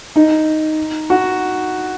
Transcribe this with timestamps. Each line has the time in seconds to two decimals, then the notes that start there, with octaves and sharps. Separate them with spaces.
0.16 D#4
1.10 F#4